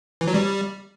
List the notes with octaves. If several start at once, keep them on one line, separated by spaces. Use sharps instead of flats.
E3
F#3
G3